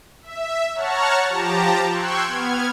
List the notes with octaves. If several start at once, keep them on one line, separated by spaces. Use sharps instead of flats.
E5
C#5 F#5 A5 A#5 C#6 F6
F3 G4 A5 A#5
G5 C6 C#6 E6 F#6 G#6
B3 F6 G#6